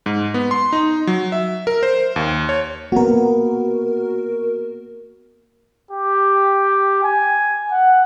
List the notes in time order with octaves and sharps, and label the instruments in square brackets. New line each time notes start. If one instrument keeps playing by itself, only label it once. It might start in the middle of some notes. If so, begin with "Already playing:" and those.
[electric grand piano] G#2
B3
C6
D#4
F#3
E5
A#4
C5
D#2
C#5
[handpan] A#3 B3 [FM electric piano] F#4 A#4
[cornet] G4
G#5
F#5